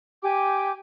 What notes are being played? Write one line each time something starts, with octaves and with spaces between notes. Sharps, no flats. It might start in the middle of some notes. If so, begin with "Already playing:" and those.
G4 G5 G#5 D6